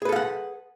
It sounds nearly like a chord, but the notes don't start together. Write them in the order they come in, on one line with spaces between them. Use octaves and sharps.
G#4 B4 A4 F5 F#5